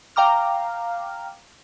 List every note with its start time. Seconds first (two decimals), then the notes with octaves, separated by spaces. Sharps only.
0.16 F5 G5 A#5 D6 F6